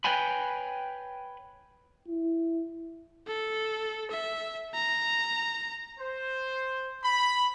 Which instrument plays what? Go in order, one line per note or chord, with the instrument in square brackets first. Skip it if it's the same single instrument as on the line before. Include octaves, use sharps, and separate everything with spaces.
[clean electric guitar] B4 C#5 G5 G#5 B5
[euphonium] E4
[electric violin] A4
E5
A#5
[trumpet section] C5
B5